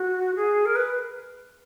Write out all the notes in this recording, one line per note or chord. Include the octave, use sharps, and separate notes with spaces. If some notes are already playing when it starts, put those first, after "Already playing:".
Already playing: F#4
G#4
A#4
B4